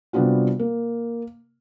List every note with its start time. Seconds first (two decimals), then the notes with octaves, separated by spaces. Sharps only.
0.13 C3 G3 B3 D4 F4 F#4
0.59 A#3